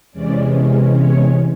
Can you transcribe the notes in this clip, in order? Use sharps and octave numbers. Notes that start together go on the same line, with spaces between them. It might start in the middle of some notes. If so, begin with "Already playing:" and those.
E2 C3 E3 G#3 C#4 D5
C#5